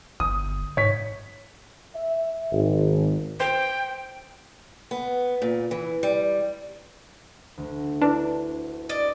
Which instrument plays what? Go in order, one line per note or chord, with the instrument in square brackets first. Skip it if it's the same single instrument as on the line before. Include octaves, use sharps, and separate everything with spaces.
[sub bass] G1 [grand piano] D#6
[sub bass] G#2 [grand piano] C#5 B6
[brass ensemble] E5
G#1
[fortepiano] C5 [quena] G5
[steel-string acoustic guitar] B3
A#2
E3
G3
[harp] D2
[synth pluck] D4 [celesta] E4 B4
[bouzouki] D5 D#5